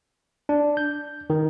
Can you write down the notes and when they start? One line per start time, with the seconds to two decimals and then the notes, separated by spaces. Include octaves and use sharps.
0.49 D4
0.77 G6
1.30 D#3